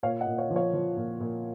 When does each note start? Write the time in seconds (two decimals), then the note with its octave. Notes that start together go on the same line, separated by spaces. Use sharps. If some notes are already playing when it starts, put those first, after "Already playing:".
0.03 A#2 C#5 F5
0.20 D#5 F#5
0.27 A#2
0.38 C#5 F5
0.50 F3
0.56 C#5 F5
0.74 F3
0.97 A#2
1.20 A#2